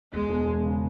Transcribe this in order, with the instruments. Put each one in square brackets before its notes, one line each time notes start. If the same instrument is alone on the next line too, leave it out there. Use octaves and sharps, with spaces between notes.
[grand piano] E1 [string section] G#3
[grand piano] E1
E2
C#3